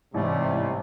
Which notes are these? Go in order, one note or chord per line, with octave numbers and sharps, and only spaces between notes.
A1 G#2 C3 G3 A3